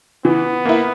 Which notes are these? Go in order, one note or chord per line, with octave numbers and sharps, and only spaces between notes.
E3 B3
A#3 E4